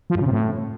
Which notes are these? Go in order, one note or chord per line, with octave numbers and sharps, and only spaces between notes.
F3
G2
C#3
C3
A2